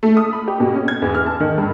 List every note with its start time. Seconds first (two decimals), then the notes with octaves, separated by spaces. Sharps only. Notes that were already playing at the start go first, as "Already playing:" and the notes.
0.03 A3
0.17 D#6
0.33 B5
0.48 G4
0.60 B2
0.74 C#4
0.88 G#6
1.02 E2
1.15 F6
1.26 A5
1.40 D#3
1.58 G2